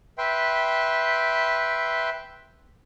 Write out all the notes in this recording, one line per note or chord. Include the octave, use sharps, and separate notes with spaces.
B4 E5 G5 C6